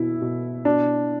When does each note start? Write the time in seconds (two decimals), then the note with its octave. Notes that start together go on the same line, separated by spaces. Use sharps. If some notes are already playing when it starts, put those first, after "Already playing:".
Already playing: B2 E4
0.22 B2
0.65 B2 D4